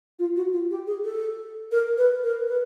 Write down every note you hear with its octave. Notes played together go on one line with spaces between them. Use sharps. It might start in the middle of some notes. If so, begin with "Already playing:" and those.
F4
F#4
F4
G4
G#4
A4
A#4
B4
A#4
B4